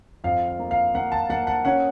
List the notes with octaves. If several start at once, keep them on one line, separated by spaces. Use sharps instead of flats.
F2 F5
F5
A#3
F5
A#3 F#5
A5
A#3 F#5
F#5
C#4 F#5